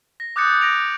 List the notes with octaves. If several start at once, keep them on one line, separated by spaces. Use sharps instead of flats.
A#6
D6 D#6 F#6 G6 A6 C#7
A#6 D7 F7